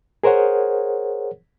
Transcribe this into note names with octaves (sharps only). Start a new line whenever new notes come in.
G#4 A#4 C5 C#5 F#5